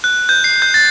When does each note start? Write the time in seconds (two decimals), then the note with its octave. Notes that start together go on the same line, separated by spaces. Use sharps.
0.04 F#6
0.29 G6
0.44 C7
0.62 G6
0.74 A6